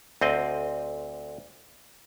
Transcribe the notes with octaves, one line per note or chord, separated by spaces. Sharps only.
D2 C4 D#5